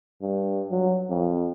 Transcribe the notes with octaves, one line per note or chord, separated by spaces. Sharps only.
G2
F#3
F2